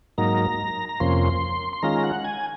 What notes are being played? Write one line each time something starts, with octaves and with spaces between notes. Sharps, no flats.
G#2 F#3 A#3 D#4 A#5
A#5
F2 C3 F3 A#3 C#4 C6
C6
D#3 G#3 C#4 F4 A#5
F#5
G#5